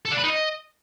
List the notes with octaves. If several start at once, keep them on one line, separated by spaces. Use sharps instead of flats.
A4
D4
B4
D#4
D#5